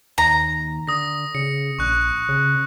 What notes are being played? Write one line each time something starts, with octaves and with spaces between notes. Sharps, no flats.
D#2 A#5
D3 D#6 A#6
C#3 C#7
A#1 C#6 F#6
C#3